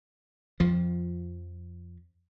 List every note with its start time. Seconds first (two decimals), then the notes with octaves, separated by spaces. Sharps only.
0.60 F2 F3